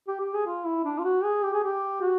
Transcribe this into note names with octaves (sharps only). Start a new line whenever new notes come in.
G4
G4
G#4
F4
E4
D4
F4
F#4
G#4
G4
G#4
G4
F#4